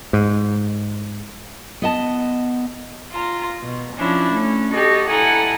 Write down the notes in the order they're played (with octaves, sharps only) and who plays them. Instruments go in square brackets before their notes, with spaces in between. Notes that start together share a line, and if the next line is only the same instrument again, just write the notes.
[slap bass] G#2
[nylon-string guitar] B3 D#5 A5
[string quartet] F4 A#5
B2
F3 C#4 D4 E4
A3 C#4
F#4 G4 A4 D#5
E4 A4 F#5 G#5 A#5